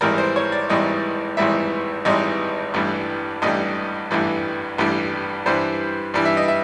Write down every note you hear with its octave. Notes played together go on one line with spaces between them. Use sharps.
G#1 G#2 E3 G3 A#4
C5
C#5
D5
G#1 G#2 E3 G3 D#5
G#1 G#2 E3 G3 E5
G#1 G#2 E3 G3 D#5
A1 G2 E3 G3
A1 G2 E3 G3 D#5
A1 G2 E3 G3
A1 G2 E3 G3
G2 E3 G3 C5
G2 E3 G3
E5
D#5
E5